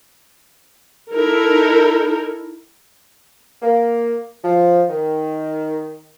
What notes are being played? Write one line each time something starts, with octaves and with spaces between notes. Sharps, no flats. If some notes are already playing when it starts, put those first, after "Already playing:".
D#4 E4 A4 A#4
A#3
F3
D#3